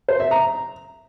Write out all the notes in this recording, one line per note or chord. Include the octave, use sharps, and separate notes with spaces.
C5
E5
A#5